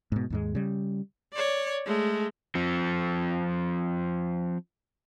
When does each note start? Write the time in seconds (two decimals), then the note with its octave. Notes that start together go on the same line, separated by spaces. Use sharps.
0.12 G#2 B2
0.30 D#2 G#2 G#3
0.55 C#3 G3
1.34 C#5 D5
1.86 G#3 A3
2.55 F3 C4